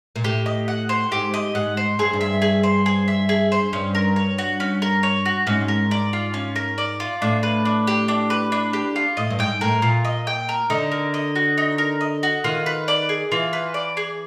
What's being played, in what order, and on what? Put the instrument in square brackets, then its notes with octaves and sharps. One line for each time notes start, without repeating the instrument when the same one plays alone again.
[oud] A#2
[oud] A2 [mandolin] G4
[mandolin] D#5
F#5
C5
[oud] G#2 [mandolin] G4
[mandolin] D#5
[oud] G#2 [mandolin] F#5
[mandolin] C5
[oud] G2 [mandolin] G#4
[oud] G2
[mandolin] E5
G#4
C5
G#4
E5
G#4
C5
[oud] G2 [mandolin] C#4
[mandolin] A#4
C#5
F#4
C#4
A#4
C#5
F#4
[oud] G#2 [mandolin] C#4
[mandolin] A#4
D5
F4
C#4
A#4
D5
F4
[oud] A2 [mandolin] D4
[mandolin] B4
D4
G4
D4
B4
D4
G4
F4
[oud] A2 [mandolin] D#5
[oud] G2
[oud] G#2 [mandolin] G5
[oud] A2 [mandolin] A#4
[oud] A#2 [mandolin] F4
[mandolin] D#5
G5
A#4
[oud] D3 [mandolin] D#4
[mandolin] A#4
D#5
F#4
D#4
A#4
D#5
F#4
[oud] D#3 [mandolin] F4
[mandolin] B4
D5
G#4
[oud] E3 [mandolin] F4
[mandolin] B4
D5
G#4